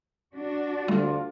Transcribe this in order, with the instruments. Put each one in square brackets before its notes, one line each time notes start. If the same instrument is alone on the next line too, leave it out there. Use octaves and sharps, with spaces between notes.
[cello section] D4 F#4
[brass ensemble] D2 D3 F4 [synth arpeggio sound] G3 A3